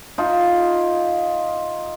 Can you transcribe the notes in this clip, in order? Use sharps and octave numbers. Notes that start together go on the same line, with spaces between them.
D#4 F4